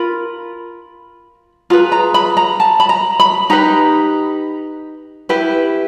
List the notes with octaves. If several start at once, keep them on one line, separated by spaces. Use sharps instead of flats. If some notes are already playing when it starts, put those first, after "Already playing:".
Already playing: F4 A#4 B5
F4 G#4 B4 A#5
A#5
B5
A#5
A5
B5
A#5
B5
D#4 G4 B4 A#5
E4 G4 B4